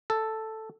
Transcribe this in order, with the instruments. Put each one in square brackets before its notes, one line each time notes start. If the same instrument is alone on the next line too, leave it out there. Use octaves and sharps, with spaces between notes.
[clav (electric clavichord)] A4